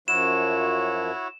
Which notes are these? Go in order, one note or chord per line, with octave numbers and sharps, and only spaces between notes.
F#2 F3 E4 F#4 C#5 E7